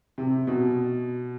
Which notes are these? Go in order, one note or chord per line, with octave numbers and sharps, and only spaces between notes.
C3
B2